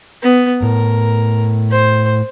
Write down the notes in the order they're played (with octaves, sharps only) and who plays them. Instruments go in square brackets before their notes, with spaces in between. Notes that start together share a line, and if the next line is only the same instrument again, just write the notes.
[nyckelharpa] B3
[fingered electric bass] A2 [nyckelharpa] A#4
[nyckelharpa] C5